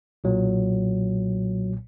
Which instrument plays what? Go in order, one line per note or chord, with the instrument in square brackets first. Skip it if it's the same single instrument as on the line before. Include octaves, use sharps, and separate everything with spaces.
[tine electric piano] B1 A#2 F#3